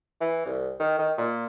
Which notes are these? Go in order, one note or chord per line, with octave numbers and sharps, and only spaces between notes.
E3
C2
D#3
D#3
A#2